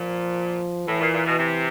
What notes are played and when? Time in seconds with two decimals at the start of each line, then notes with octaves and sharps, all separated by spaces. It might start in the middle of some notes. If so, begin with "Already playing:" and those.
Already playing: A#2 F3
0.88 A2 E3
1.01 A#2
1.13 A#2
1.25 B2
1.37 C3